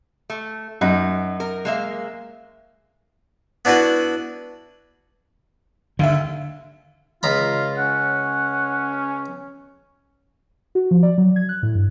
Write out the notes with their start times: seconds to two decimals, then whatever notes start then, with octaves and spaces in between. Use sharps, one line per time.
0.30 A3
0.81 F#2 D#4
1.40 A#4
1.65 G#3 A#3 E5
3.65 B3 D4 E4 F#4 B4
5.99 D#2 D3 E5
7.23 C#2 F4 A#5 B5
7.78 C#4 F#5
10.75 F#4
10.91 F3
11.03 D5
11.18 F#3
11.36 G#6
11.49 F#6
11.63 A2
11.75 G2